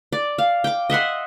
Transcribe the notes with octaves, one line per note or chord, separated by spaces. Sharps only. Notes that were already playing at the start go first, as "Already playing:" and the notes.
D5
F5
G5 D6
D#5 E5 F#5 C6